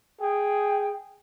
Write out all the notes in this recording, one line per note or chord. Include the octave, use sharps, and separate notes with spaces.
G#4 G5